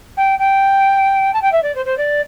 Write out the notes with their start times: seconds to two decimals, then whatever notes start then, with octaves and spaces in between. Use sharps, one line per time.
0.17 G5
0.39 G5
1.33 A5
1.42 G5
1.52 E5
1.63 D5
1.75 C5
1.86 C5
1.98 D5